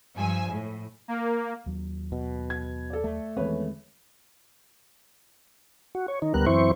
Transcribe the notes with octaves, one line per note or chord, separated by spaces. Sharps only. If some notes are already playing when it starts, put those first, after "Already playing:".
G2 F3 G#5 E6
A2
A#3
D#2 F#3
B2
G#6
A4 D5
A3
E2 D#3 G#3 C4 B4 C#5
F#4
C#5
D#3 D#4
D2 G3 B3 A#4 F#6
F#2 E3 C4 E4 C5 C#6